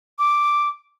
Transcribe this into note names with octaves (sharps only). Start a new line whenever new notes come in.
D6